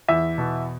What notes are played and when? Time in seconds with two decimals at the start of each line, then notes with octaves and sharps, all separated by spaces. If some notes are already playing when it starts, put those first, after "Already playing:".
0.08 E2 E5
0.38 B2